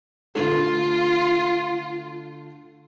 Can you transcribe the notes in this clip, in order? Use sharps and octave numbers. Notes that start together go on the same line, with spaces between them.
D3 A3 F4